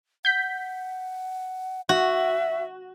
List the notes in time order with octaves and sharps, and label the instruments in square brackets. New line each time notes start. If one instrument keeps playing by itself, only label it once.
[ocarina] F#5 [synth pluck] G6 B6
[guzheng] F#4 [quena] E5 [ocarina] F#5